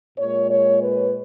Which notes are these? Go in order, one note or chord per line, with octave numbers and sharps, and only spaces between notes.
A#2 G#3 C#5
C#5
B4